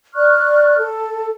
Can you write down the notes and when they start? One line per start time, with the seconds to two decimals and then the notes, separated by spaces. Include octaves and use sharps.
0.15 D5 C#6 F6 F#6
0.77 A4